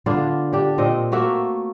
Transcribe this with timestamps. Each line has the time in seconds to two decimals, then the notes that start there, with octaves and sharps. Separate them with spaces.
0.06 D3 B3 D4 F4
0.53 D4 G4
0.78 A#2 C4 D#5
1.12 A3 A#3 F#4 E5